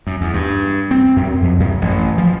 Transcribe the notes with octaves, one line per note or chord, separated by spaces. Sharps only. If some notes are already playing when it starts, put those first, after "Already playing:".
F#2
E2
G2
C4
F#2
F2
F#2
A1
F3